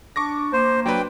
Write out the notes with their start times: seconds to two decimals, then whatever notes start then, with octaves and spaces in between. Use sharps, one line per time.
0.16 D4 C#6 D6 A#6
0.53 A#3 C5
0.86 F#3 D4 B4 G5